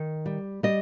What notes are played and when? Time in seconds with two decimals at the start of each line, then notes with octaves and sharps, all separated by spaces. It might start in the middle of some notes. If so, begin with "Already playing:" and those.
Already playing: D#3
0.26 G3
0.63 G3 D#5